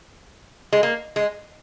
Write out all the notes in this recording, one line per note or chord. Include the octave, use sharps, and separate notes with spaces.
G#3
A#3
G#3